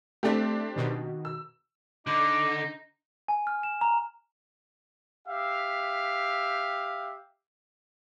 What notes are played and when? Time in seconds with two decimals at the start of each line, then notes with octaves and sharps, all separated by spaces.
0.23 A3 C4 D4 G4
0.76 B2 D#3
1.25 E6
2.07 D3 D#4 D6
3.28 G#5
3.47 F6
3.63 E7
3.81 A#5
5.28 G4 E5 F5